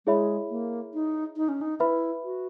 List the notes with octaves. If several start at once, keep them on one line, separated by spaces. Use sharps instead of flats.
G#3 E4 G#4 C#5 E5 B5
A#3
D#4
D#4
C#4
D#4
E4 B4 E5 B5
F#4